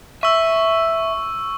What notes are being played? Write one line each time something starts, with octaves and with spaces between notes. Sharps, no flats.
E5 C#6 E6